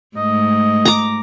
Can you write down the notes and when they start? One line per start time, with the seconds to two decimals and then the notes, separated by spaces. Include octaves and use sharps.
0.17 G#2 A3 D#5
0.85 A#5 D6